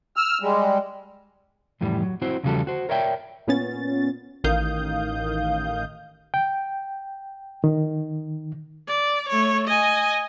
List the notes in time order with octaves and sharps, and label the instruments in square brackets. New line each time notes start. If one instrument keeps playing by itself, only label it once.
[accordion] E6 F6
G3 G#3
[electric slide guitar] F2 A2 E3 G3
F#3
C4 E4 F#4 C5
E2 C#3 F3 G3 F#4 A4
F#4 C5
A#4 C#5 D5 E5 F#5 G5
[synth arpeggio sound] A#2 B3 C#4 A6
A1 D#3 F5 D#6 G6
[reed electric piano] G5
D#3
[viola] D5
A3 C#5
D#5 G#5